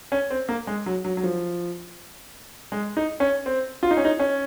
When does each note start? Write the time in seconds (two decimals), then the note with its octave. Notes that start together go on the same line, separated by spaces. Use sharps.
0.12 C#4
0.30 C4
0.49 A#3
0.67 G#3
0.86 F#3
1.05 F#3
1.17 F#3
1.23 F3
2.72 G#3
2.97 D#4
3.20 C#4
3.46 C4
3.83 F4
3.91 D#4
3.97 C#4
4.05 D#4
4.20 C#4